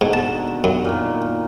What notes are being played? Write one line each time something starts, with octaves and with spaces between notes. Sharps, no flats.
G#2 B2 D3 D#3
A5
F#2
A#2 D#3